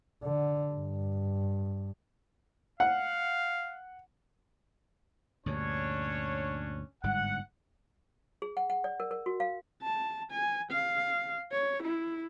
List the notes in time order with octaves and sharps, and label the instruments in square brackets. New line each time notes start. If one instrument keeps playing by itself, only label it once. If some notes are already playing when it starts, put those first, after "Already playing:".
[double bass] D3
G2
[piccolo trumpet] F5 [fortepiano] F#5
[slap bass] D2 G2 A#2 [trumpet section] C#4 D4 C#5
[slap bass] G1 G#2 G3 [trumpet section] F#5
[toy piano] G#4
F#5
F#5
D5
A#4
A#4
F#4
F5
[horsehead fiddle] A5
G#5
F5
C#5
E4